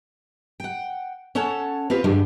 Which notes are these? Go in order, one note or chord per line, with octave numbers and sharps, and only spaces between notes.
F#5 G5
C#4 A4 C#5 F#5 A5
C4 F4 G4 B4
G2 D3 G3 G#3